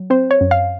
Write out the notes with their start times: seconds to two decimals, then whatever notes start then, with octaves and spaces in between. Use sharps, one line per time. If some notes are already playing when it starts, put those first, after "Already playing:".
Already playing: F#3
0.10 C4 C5
0.31 C#5
0.41 F#2
0.51 F5